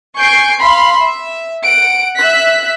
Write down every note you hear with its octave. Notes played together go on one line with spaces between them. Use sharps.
G#5 C#6 G6 C7 D7
F5 B5 C6
E5
F#5 D7
E5 F#6 B6